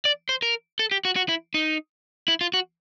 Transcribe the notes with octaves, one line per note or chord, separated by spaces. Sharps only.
D5
C5
A#4
A4
G4
F#4
F#4
E4
D#4
E4
F4
F#4